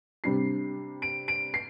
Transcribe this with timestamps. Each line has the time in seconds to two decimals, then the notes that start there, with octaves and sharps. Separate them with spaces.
0.24 C3 G3 D4 C7
1.02 D7
1.28 D7
1.54 C7